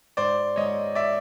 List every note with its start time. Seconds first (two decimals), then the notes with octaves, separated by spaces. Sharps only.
0.17 G#2 C5 D5
0.56 G#2 C#5 D#5
0.95 D5 E5